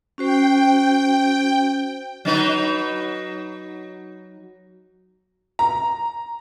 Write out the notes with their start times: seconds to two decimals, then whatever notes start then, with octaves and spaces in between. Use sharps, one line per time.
0.18 C#4 F#4 C5 G5
2.25 F#3 D#4 B4
5.59 A#5